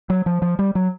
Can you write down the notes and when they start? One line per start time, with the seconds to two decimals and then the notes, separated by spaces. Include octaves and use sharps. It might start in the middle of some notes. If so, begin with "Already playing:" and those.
0.10 F#3
0.26 F3
0.42 F3
0.59 G3
0.75 F#3